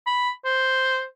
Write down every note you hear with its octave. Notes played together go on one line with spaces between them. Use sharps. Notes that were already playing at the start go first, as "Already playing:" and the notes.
B5
C5